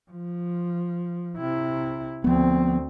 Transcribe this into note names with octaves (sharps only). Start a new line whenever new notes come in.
F3
C3 E4
D2 F3 B3 C4